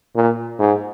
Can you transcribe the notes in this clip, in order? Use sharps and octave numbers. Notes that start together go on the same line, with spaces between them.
A#2
G#2